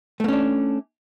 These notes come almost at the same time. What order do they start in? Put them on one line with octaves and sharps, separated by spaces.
A3 A#3 C#4 D4